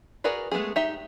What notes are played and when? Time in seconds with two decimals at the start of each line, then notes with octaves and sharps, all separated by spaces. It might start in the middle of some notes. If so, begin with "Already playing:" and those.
0.24 F#4 G#4 A#4 B4 D5
0.51 G#3 A3 B3 E4 G#4
0.76 D#4 G4 E5